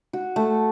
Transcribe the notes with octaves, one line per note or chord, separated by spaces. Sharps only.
F#4
A3